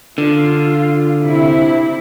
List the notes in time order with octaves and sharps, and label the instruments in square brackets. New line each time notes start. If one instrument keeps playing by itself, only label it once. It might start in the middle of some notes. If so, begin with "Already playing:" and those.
[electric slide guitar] D3 [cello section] F4
[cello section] C3 E4